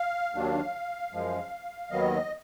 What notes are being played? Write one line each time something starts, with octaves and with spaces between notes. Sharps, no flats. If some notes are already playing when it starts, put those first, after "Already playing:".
Already playing: F5
D#2 D#3 F#3 D4
F#2 F3 G#3
D#2 D#3 F#3 B3 D#5